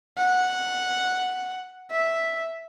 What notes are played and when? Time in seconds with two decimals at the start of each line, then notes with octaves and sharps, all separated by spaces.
0.18 F#5
1.92 E5